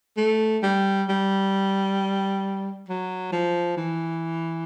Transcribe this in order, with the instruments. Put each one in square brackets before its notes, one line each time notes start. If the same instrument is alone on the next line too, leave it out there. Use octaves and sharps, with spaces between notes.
[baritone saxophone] A3
G3
G3
F#3
F3
E3